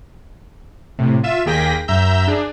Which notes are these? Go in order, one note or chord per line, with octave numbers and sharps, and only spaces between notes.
A2 C3
F4 E5 E7
D#2 A#3 G#4 G5 A#6 B6
F#2 E5 A#5 E6 G6
D4 G#4